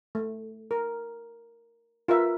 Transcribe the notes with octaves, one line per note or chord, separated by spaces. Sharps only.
A3
A#4
F4 A#4 B4 E5